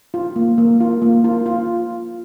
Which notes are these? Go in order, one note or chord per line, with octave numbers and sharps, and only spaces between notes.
F4
A#3
A#3
F4
A#3
F4
F4